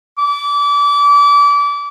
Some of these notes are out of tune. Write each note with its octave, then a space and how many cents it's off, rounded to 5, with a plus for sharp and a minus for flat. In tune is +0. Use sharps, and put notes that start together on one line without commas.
D6 -30